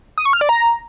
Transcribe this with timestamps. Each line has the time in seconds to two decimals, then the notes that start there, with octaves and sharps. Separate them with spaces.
0.18 D#6
0.25 C#6
0.33 F6
0.41 D5
0.49 A#5